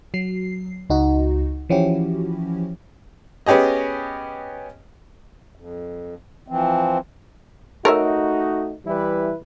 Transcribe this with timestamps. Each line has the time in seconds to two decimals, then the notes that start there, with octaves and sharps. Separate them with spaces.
0.14 F#3 C7
0.90 C#2 D#4 F#4
1.69 E3 F3 C#4 E4 F#4 G4
3.46 B3 C#4 G4 G#4 D#5
5.55 F2
6.48 E3 F3 C4
7.85 A3 D#4 F#4 A4 A#4 C#5 E5
8.86 E3 G3 E4 B4